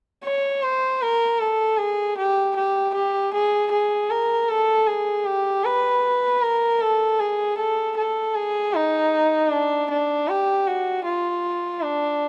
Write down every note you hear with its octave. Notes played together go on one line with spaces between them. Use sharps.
C#5
C5
A#4
A4
G#4
G4
G4
G4
G#4
G#4
A#4
A4
G#4
G4
B4
A#4
A4
G#4
A4
A4
G#4
D#4
D4
D4
G4
F#4
F4
D4